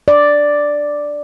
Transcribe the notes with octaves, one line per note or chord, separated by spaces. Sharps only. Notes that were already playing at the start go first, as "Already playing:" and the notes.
D5